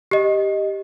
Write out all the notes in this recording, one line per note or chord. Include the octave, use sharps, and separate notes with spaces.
G4 D#5